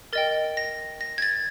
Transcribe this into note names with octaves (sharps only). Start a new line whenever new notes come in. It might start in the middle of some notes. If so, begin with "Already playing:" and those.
A#4 D#5 G5 A6
A#6
A#6
G#6
A6